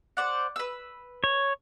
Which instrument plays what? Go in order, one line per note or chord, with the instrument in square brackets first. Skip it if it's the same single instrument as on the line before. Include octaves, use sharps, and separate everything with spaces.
[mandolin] C5 D5 F#5
B4 E6
[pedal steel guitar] C#5